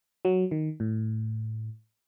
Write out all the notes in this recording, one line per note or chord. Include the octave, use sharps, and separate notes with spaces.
F#3
D#3
A2